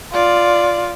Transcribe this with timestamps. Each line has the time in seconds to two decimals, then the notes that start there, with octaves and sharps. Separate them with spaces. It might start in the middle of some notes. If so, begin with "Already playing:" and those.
0.13 F4 D5